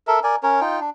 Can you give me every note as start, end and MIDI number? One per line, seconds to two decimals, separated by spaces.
0.07 0.20 69
0.07 0.20 70
0.07 0.20 76
0.24 0.36 70
0.24 0.36 74
0.24 0.36 80
0.43 0.60 61
0.43 0.60 70
0.43 0.60 73
0.61 0.80 63
0.61 0.80 65
0.61 0.80 79
0.80 0.90 62